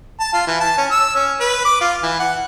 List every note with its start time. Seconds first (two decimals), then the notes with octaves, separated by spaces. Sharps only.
0.20 A5
0.33 F4
0.47 E3
0.60 A5
0.78 C#4
0.91 E6
1.16 C#4
1.40 B4
1.65 D6
1.81 F4
2.03 E3
2.19 F#5